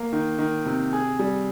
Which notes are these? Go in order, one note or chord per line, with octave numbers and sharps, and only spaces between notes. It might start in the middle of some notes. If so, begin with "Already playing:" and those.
Already playing: A#3
D#3
D#3
C3
G#4
G3